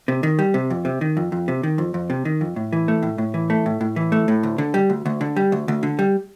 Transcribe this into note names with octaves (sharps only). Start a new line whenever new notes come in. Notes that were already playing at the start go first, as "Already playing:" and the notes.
C3
D#3
G3
C3
F2
C3
D#3
F2
F2
C3
D#3
F2
F2
C3
D#3
F2
A2
E3
A3
A2
A2
E3
A3
A2
A2
E3
A3
A2
D2
D3
G3
D2
D2
D3
G3
D2
D2
D3
G3